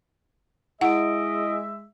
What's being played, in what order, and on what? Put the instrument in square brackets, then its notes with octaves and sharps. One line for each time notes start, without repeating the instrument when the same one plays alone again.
[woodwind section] G#3 E5 [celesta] E4 D7 [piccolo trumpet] D#5 [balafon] F#5